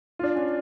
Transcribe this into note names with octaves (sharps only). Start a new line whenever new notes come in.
F4
D4
C#4